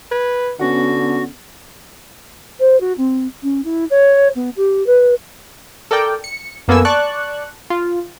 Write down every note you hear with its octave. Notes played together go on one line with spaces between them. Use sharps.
B4 G#6
D3 B3 C#4 F#4 F#5
C5
F#4
C4
C#4
E4
C#5
B3
G4
B4
A4 A#4 D5 G5
C#7
F#2 A#3 B3 A4 G#5 E6
D5 A5 C#6 F#6
F4